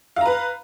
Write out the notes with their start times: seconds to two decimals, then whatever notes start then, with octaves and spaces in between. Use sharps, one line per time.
0.16 F5
0.21 A#5
0.26 B4